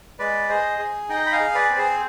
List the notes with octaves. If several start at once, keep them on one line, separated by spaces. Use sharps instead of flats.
G#3 B4 D5
G#4 C5 D#5
G#4
D#4 D#5 G5
B5
F5 G#5
G#4
B4 D5
C4
G#4 C5